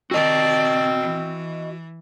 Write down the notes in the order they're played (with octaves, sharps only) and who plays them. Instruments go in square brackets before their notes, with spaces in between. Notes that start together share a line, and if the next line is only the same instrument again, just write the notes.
[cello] D#3 D5 [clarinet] C4 [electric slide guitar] F#4 D#5
[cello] E3